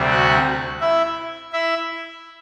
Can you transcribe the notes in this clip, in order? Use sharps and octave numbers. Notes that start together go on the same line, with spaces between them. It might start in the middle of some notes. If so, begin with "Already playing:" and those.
Already playing: D2 C3 G3 C4
F#4 F#5
E4 E5
E4 E5